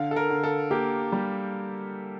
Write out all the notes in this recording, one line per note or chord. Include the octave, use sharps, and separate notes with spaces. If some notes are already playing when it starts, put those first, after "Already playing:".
Already playing: D3 F5
A4
A#4
D3
A4
A#3 G4
G3